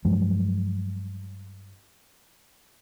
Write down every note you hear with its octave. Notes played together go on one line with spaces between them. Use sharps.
G2 F3 F#3 G#3